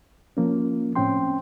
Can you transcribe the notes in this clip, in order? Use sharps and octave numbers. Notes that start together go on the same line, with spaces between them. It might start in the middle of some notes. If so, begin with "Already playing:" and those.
F3 A#3 C#4
A2 C4 C#4 G5 C6